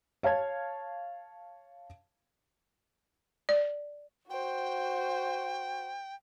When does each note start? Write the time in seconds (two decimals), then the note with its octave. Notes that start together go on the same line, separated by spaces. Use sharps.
0.23 C#5 F5 A5 G#6
3.49 D5
4.30 F#4 C5 G5